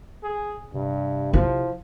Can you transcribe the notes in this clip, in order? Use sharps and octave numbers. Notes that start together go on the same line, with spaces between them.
G#4
G2 C3
F3 E4